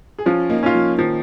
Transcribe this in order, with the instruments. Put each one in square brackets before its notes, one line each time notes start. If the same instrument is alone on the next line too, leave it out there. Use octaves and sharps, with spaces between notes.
[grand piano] G#4
[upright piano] F3 [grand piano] C#4 F4
[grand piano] A#3 D#4
[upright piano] C#4 F4
[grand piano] F3
[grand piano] D#3 [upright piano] F3